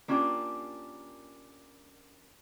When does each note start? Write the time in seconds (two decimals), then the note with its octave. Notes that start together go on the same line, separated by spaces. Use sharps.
0.08 A#3 C#4 D4 F4 G4 A#4